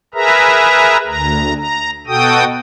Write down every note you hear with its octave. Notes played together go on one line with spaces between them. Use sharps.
G#4 A#4 B4 E5 A#5
D2 A#5
A#5
B2 F#4 A4 G5 D#6